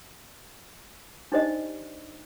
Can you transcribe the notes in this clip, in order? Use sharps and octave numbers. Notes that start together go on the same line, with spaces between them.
D4 D#4 G4 C5 D5 D#5